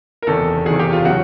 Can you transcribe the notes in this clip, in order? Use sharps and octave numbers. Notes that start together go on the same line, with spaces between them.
A#4
F#1 E2 C3 D#3 A4
F#1 E2 C3 D#3 G#4
G4
F4
C#3 F#3 F#4